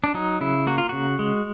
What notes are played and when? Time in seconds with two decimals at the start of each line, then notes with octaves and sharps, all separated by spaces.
0.04 D4
0.14 F#3 D#4
0.41 C#3 E4
0.67 A#3 F#4
0.78 F4
0.89 C#3 F#4
1.19 G#3